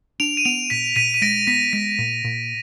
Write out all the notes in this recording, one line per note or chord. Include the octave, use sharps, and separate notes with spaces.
D4 D7 F7
D#7
B3 D7 F7
A#2 B6 D#7
A#2 B6 D#7
D#7
G#3 A#6 D7
B3 B6
G#3 B6
A#2
A#2